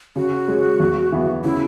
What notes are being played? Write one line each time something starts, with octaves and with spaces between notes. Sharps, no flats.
C#3 F#4
G#3 C#4
E2
E3 B3
C#3 E4